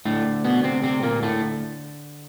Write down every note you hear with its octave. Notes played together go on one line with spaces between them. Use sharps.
D2 A2 D3 A3
B2 B3
C3 C4
C3 C4
A#2 A#3
A2 A3